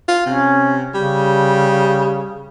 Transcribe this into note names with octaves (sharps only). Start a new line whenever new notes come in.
F4
C3 C#4
C#3 G3